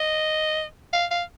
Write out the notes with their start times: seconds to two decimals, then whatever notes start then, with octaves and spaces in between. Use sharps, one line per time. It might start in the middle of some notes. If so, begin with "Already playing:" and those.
Already playing: D#5
0.93 F5
1.11 F5